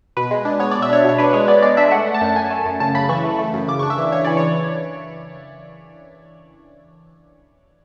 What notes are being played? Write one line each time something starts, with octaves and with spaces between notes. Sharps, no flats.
B2 B4
G#3
D4
B3 C#5
B2 D5
E5
D4 C#5
B2 C#5
D4 B4
G#3 C#5
B3 D5
G#3 D5
D4 E5
A3 F#5
A3
A5
F#2
F#2 G#5
A3
F#2
C#3 A5
C#3 B5
E3 C#6
A3
A3
F#2
C#3 D6
D4 C#6
E5
E3
C#3 C#5
E3 D5
C#5